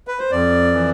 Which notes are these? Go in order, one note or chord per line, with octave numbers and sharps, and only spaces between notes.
B4
C5
F2 D5
E3